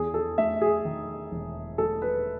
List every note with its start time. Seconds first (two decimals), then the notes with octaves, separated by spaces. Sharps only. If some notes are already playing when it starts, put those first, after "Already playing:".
Already playing: E2 G#4
0.14 A4
0.38 A3 E5
0.62 G#4
0.85 D#3
1.31 E1
1.78 A3 A4
2.02 B4